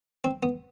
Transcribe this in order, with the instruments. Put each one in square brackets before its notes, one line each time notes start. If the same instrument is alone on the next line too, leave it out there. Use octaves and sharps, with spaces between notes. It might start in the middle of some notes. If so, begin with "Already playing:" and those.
[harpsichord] C4
B3